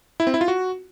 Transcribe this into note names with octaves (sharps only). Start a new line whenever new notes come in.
E4
C4
E4
F4
F#4